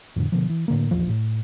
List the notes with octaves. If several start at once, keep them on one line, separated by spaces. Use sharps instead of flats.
F2 A2 D3
B2 D3 F3
E3
A2 D3 A#3
D#1 A#1 E2 F3
A2